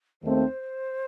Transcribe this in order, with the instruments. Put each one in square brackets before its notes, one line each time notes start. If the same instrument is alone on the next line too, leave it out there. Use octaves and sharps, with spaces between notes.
[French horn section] D#2 D#3 A3 C4 [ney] C5